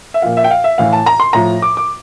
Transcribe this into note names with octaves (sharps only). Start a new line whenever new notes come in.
E5
A#2 F3 F5
E5
G5
F5
E5
A2 E3 F5
A5
A#5
C6
A2 F3 A#5
D6
D6